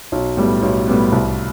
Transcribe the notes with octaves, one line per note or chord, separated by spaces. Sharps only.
B1
A2 G3 B3
B1
A2 G3 B3
C2